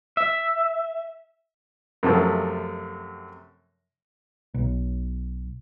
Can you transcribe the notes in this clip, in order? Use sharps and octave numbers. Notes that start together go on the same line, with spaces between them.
E5
F#2 C3 F3 A3
B1